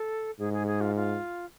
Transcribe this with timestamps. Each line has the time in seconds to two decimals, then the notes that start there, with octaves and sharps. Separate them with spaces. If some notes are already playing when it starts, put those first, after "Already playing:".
Already playing: A4
0.39 G#2 G#4
0.53 G#4
0.67 G#4
0.81 F4
0.96 F4